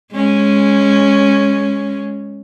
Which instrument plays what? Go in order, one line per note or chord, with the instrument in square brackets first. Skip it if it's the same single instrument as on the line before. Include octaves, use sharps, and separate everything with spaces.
[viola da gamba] G#3 C#4